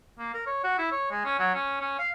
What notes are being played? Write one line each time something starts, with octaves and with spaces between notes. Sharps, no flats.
A#3
A#4
C#5
F#4
E4
C#5
G#3
C#4
F#3
C#4
C#4
F5